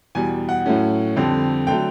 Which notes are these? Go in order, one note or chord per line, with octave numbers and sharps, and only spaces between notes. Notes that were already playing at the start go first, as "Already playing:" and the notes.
E2 B2 G3 G#5
F#5
A2 F#3 A3 C#4
F2 D3 G3 C4
D3 F#3 A3 G5